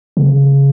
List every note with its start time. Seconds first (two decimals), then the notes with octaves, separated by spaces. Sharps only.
0.17 C#3